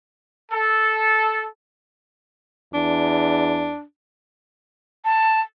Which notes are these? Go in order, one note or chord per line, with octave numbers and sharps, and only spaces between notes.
A4
E2 D4
A5